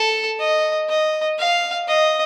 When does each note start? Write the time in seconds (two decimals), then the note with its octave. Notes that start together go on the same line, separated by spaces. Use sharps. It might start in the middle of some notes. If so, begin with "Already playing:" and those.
Already playing: A4
0.40 D#5
0.89 D#5
1.38 F5
1.87 D#5